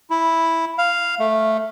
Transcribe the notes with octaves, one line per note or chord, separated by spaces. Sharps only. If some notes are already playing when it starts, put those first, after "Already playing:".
E4
F5
A3